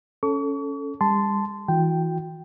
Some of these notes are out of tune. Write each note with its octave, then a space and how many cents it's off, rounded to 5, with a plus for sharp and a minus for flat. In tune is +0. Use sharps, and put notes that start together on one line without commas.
C#4 +0 A4 +0 C#6 +40
G3 +45 A5 +0 C6 -15
E3 -15 F#4 -25 G5 +0